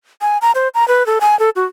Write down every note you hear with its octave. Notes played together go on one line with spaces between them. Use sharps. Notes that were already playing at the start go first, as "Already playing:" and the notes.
G#5
A#5
C5
A#5
B4
A4
G#5
A4
F#4